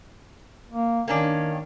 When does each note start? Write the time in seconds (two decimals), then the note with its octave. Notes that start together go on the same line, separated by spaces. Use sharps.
0.72 A#3
1.08 D#3 A#3 C#4 D4